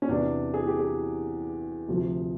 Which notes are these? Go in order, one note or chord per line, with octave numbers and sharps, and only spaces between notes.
C#4
E2 C3 E3 D4
G#4
G4
G#4
D2 C3 F3